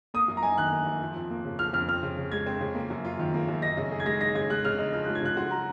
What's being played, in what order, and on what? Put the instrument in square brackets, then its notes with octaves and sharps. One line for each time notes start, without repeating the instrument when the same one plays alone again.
[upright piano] A#3 [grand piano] D#6
[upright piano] F#2
[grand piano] A#5
[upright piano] D#4 [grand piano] G#5
[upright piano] D#3 [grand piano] F#6
[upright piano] A#3
F#2
F3
F2
A#3
C#3
[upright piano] F3 [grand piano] F6
[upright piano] F2 [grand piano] F6
[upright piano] C4 [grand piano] F6
[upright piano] C#3
C#3
[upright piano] G#3 [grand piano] G#6
[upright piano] C4
C#3
A#3
F#2
F4
D#3
A#3
F#2
[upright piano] D#4 [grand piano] A#6
[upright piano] C#3
G#4
[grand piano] G#6
[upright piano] G#3 [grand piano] A#6
[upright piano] D#4 [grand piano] A#6
[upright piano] C#3 [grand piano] G#6
[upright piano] G#3 [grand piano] F#6
[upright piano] C#3 [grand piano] F6
[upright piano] D#4 [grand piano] F6
[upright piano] F3 [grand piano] F6
[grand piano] F#6
[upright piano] G#3
[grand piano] G#6
[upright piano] C#3 [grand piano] F#6
[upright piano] F#4 [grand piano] C6
[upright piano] F#3 [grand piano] A#5